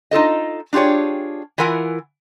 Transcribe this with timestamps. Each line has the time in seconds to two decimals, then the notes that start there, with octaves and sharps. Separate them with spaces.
0.11 D#4 F4 A4 D#5
0.73 D4 F4 G4 G#4 C#5
1.58 E3 E4 F4 A#4 F#5 G#5